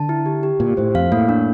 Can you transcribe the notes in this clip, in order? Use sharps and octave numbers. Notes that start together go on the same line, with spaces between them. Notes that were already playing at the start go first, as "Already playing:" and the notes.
Already playing: D3 A5
E4
G4
G4
A#2 G4
A2 C5
F2 F5
A2 A#3
D4